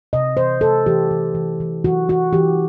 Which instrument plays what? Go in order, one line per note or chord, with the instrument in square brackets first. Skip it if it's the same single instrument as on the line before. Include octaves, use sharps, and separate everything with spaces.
[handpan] C3 D#5
E3 C5
A3 A4
E3 G4
E3
E3
E3
E3 F#4
E3 F#4
E3 G4